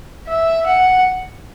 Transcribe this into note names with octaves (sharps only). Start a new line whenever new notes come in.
E5
F#5